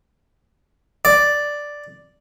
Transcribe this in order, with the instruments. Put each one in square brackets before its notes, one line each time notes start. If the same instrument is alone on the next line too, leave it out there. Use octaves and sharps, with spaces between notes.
[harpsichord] D5